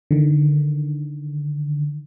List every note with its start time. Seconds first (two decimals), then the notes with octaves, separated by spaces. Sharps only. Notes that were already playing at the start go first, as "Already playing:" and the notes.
0.11 D3 D#3